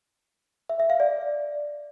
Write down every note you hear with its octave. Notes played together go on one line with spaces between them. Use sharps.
E5
E5
F5
D5